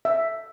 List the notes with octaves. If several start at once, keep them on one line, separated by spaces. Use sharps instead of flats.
E5